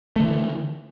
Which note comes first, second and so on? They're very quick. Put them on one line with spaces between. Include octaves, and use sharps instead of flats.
A3 D3 E3